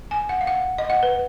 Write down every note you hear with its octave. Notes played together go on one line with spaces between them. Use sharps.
G#5
F#5
F5
F#5
D#5
F#5
B4